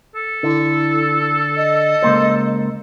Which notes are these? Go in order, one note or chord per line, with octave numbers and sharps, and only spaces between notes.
A4
D3 E4
D#5
C#2 A#3 C5